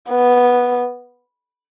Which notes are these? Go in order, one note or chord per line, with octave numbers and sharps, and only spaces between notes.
B3